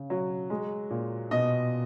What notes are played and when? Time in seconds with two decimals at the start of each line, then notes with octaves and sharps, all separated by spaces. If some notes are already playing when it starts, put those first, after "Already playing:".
Already playing: C#3
0.10 F#3
0.50 G#3
0.90 A#2
1.31 B2 D#5